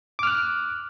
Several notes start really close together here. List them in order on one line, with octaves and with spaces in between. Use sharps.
D6 F6 F#6